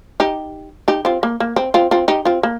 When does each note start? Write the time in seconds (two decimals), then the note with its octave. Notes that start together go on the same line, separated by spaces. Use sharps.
0.20 D#4 G4
0.88 D#4 G4
1.05 C4 F4
1.23 A#3
1.40 A#3
1.56 C4
1.74 C4 F4
1.91 C4 F4
2.08 D#4 G4
2.25 C4 F4
2.43 A#3